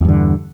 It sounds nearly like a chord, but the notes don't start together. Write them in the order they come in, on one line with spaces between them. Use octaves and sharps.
E2 G2 D3